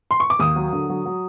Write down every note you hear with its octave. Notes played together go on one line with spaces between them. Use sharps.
C6
C#6
D6
D#2 D#6
F#3
D3
F#3
F#3